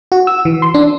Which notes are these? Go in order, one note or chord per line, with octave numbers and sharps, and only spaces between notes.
F#4
E6
E3
C6
D4